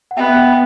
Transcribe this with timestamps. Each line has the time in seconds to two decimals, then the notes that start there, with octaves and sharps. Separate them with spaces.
0.11 F#5
0.17 B3 E5 G5